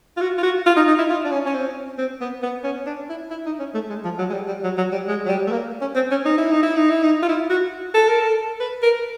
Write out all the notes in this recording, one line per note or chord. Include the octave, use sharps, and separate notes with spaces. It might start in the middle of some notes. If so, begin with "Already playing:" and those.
F4
F#4
F4
F#4
F4
D#4
D#4
E4
F4
D4
C#4
C#4
C4
C4
B3
B3
C#4
D4
E4
E4
D#4
C#4
A3
G#3
F3
F#3
G#3
G3
G3
F#3
F#3
G3
G#3
F#3
G3
A3
A#3
C#4
C4
C#4
D#4
E4
D#4
E4
D#4
E4
D#4
F4
E4
F#4
A4
A#4
A4
B4
A#4